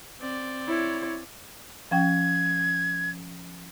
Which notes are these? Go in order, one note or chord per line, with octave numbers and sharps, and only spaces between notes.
C4 D5
E4 C#5
F3 C#4 G5 G#6